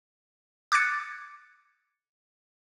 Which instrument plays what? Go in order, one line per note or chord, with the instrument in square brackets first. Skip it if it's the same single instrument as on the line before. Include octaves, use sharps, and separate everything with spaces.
[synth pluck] D6 F#6 G#6 A6 C#7